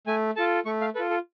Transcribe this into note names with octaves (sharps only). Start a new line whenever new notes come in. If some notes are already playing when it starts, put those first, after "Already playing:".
A3 G#5
F4 A4 A5
A3 C#6
F5
F4 A4 B4
A4